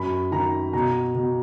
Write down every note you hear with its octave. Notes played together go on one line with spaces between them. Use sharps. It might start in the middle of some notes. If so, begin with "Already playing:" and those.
Already playing: F#2 B5
D#3 A#5
B2 A#5
B2